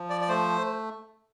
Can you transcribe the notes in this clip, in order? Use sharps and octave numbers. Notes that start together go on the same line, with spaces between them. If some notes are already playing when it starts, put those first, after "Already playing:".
Already playing: F3
D5
D5
A3 C5